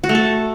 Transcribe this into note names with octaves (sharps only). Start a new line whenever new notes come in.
F#4
A3
A4